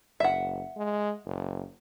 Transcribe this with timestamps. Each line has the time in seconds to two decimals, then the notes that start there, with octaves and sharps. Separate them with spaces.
0.20 F#1 E5 F#5
0.77 G#3
1.26 F#1